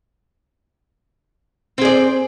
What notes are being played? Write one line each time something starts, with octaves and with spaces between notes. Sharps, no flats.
C4 G#4 D5